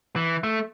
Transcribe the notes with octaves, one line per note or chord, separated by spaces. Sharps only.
E3
A3